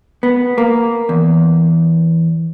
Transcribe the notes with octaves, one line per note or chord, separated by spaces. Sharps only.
B3
A#3
E2